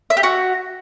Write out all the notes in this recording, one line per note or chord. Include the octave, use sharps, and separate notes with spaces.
E5
G4
F#4